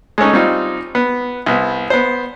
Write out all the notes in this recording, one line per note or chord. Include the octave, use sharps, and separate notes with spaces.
G#3 A3 C#4 D#4
G3 C4 D#4 F4
B3
C2 B3
B3 C5